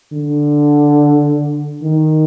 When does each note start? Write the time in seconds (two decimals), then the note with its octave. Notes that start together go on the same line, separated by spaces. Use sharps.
0.12 D3
1.82 D#3